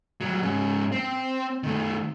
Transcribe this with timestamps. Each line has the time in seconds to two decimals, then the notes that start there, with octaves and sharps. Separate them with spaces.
0.21 F#3 G3
0.42 G#2 C#4
0.92 C4
1.63 D#3 A3